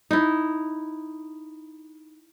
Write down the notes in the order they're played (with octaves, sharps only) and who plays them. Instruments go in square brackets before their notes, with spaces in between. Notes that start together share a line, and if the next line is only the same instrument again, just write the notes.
[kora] D#4 E4